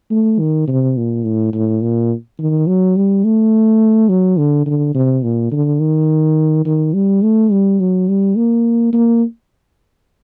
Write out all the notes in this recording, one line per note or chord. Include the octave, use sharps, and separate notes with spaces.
A3
D#3
C3
A#2
A2
A2
A#2
D#3
F#3
G3
A3
F#3
D3
D3
C3
A#2
D3
D#3
D#3
G3
A3
G3
F#3
G3
A#3
A#3